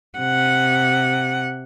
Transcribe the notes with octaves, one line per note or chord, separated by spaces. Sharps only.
C3 F#5